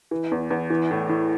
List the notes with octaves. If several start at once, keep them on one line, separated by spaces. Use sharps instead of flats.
E3
E2
E2
E3
A2
A2